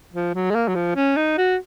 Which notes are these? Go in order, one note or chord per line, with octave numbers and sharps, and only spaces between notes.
F3
F#3
G#3
A#3
F#3
F3
C#4
D#4
F#4